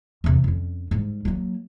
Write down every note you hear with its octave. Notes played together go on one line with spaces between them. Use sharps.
E2 C3
F2 C#4
G#2 G3
F#3 A#3